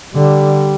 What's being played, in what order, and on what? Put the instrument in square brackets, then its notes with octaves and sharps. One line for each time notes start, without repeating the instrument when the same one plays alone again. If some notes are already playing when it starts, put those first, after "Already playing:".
[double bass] D3 [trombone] G3